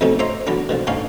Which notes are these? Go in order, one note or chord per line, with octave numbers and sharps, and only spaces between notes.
F2 B2 F3 A3 C#4 D#4
C5 C#5 D#5 E5 A#5 C6
D3 E3 F#3 B3 D4
B2 D3 F3
A2 D3 C#4 D#4 C#5 F5